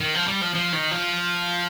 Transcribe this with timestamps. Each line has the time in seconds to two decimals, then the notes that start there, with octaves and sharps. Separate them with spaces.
0.01 D#3
0.15 F3
0.28 G3
0.42 F3
0.55 F3
0.73 D#3
0.91 F3